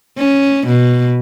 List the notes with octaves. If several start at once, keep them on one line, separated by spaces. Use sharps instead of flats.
C#4
B2